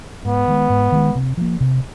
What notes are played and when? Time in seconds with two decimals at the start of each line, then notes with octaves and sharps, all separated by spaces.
0.25 G#2 B3
0.48 D#3 G#3
0.69 G#2
0.92 D#3 G#3
1.15 C3
1.37 F3 A#3
1.60 C3